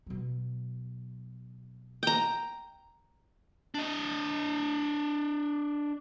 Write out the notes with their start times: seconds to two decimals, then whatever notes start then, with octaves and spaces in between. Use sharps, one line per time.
0.06 B2 F#3
2.03 G5 A#5
3.74 D4 D#5